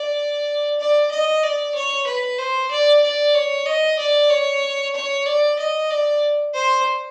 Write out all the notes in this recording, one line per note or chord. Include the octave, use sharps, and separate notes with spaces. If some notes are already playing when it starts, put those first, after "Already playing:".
Already playing: D5
D5
D#5
D5
C#5
B4
C5
D5
D5
C#5
D#5
D5
C#5
C#5
D5
D#5
D5
C5